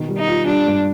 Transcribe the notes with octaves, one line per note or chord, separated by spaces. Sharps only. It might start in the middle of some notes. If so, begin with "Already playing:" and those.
Already playing: B2 D#3
G3
D#4
F4
G3 D4
G2